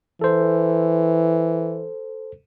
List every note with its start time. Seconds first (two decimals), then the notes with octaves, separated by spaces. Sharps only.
0.21 E3 A4 C5